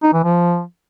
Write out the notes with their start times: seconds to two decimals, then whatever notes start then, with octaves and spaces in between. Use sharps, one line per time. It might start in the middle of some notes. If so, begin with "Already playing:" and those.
0.03 D#4
0.13 E3
0.24 F3